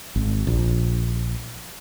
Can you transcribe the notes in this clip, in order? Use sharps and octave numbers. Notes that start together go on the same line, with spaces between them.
G#1
A#1